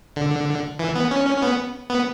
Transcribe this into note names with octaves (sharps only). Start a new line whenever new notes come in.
D3
E3
B3
C#4
C#4
C#4
B3
B3